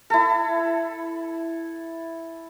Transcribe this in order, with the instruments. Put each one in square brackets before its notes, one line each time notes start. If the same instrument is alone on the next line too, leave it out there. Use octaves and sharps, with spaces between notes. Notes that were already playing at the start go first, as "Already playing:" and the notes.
[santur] E4 A4